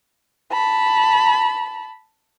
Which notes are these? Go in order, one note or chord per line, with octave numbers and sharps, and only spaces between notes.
A5 B5